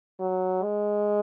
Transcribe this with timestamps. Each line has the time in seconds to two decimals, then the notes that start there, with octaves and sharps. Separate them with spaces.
0.20 F#3
0.63 G#3